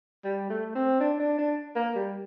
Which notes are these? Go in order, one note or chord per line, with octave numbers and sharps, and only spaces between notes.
G3
A3
C4
D4
D4
D4
A#3
G3